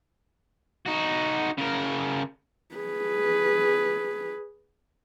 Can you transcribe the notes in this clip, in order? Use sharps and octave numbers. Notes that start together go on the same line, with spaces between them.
D#4 F#4
C#3 A#4
G#4 B4